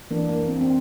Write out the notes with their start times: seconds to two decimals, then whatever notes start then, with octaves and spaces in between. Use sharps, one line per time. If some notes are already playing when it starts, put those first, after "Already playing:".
0.11 E3 A#3 D4
0.29 A#3
0.48 C4
0.61 C4